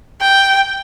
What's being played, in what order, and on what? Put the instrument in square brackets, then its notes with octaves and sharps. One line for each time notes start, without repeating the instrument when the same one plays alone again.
[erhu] G5